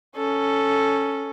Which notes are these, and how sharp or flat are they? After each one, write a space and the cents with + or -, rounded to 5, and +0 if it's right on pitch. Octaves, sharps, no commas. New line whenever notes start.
C#4 +0 A4 +0